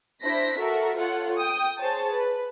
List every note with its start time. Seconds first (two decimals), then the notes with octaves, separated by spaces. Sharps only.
0.23 D4 E4 C5 A#6 B6
0.58 F#4 A4 A#4 E5
0.96 F4 A4 C#5 F#5
1.38 G5 D#6
1.79 G#4 C5 C#5 A5
2.11 B4